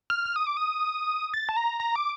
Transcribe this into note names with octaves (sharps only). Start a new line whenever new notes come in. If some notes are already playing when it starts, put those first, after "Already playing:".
F6
F6
D#6
D6
D#6
A6
A5
A#5
A#5
D6